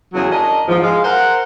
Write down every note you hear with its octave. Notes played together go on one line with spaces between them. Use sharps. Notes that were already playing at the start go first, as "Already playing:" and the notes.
E2 C#3 F#3 G#4
D4 A#4 D#5
E2 G#2 F3
G#3 F5
A#4 C5 F#5